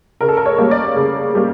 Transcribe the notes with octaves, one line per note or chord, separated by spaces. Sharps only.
C#3 A#4
A4
A#4
C#5
G3 A#3
D5
C#3
G3 A#3